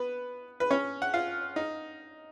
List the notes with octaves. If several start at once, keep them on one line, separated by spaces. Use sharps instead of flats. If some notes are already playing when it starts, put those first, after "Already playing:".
Already playing: B3 B4
B4
C#4 C#5
F#5
F4 F5
D#4